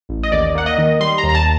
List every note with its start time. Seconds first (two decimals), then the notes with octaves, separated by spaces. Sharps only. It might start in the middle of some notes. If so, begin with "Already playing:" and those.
0.09 A1
0.23 D#5
0.32 D#2 D5
0.55 A#3 F#5
0.66 D#5
0.78 D#3
1.00 G3 C6
1.18 A#5
1.23 D#2
1.29 A#5
1.35 A5